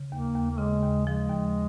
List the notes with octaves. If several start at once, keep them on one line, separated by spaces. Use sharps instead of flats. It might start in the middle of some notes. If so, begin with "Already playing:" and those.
Already playing: C#3
D#2 A#3
D#2
A#3
C#3 G#3
D#2
F3 G#3
D#2